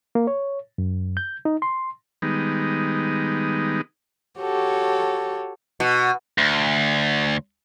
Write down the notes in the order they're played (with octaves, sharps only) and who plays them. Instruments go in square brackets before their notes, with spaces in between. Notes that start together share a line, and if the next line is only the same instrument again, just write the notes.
[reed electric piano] A#3
C#5
F#2
G6
D#4
C6
[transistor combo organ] D#3 G3 G#3 B3 D#4
[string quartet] F#4 G4 A4 C#5
[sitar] B2
[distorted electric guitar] D2